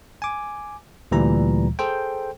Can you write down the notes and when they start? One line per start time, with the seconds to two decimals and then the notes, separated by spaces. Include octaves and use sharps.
0.22 G#5 D6
1.11 D2 A#2 E3 G3 A#5
1.79 G#4 A4 C5 G5